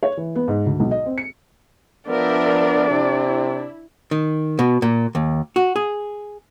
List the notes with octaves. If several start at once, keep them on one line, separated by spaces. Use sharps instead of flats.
C#5
E3
B3
G#2
D2
B1
D#5
C4
C#7
F3 B3 D4 A#4 D5 E5
C3 E4
D#3
B2
A#2
D#2
F#4
G#4